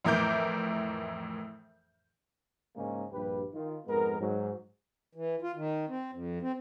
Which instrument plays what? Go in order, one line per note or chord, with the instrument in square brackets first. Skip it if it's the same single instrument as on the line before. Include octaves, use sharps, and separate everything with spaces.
[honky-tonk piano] F2 A2 E3 A#4 D6 G6
[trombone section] G#2 C#3 G#3 A#3 C#4 D#4
A#1 G2 G4 B4
D#3 F4
F2 G#2 G#3 B3 A#4
G#2 F#3
[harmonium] E3
F4
D#3
C4
F2
C4